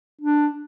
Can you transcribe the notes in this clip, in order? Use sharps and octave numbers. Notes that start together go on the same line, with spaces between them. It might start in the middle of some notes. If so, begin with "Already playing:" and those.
D4